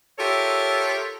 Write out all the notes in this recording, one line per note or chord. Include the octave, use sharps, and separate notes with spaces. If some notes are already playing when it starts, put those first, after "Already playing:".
F4 G4 A4 A#4 C#5 E5